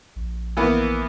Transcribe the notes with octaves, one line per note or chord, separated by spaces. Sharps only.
A#1
E3 A#3 B3